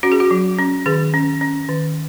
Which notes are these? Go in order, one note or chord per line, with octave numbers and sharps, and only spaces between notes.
C#4 F#4
G#4
F#4
F#3
C#4
D#3 G#4
C#4
C#4
D#3